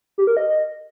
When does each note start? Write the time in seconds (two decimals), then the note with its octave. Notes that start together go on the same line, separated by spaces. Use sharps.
0.18 G4
0.27 A#4
0.37 D#5